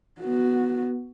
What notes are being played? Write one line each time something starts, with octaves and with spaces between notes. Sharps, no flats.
B3 F#4